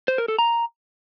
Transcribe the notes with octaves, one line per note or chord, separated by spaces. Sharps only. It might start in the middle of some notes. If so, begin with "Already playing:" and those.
C5
A#4
A4
A#5